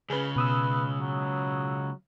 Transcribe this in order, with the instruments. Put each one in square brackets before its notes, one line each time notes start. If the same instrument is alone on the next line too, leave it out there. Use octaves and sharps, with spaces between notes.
[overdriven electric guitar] C#2 C#3 [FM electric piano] G#4 B4
[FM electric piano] B2 D#6 E6 [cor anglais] B4
[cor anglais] F#3